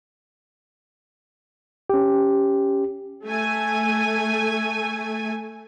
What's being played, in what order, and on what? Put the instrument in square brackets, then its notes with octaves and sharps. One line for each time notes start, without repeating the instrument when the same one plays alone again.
[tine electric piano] C#4 G4
[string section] A3 G#5